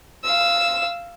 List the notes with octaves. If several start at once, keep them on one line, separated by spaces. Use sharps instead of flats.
F5 E6